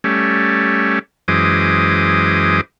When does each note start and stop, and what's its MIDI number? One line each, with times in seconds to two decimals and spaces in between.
0.04 0.99 55
0.04 0.99 57
0.04 0.99 61
1.28 2.61 42
1.28 2.61 52
1.28 2.61 56
1.28 2.61 72
1.28 2.61 86
1.28 2.61 87